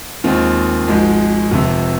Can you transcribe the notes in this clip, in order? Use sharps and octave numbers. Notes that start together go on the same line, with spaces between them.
D#2 D#3 G#3 C4 F4
G#1 G#2 F3 G#3
F1 F2 C3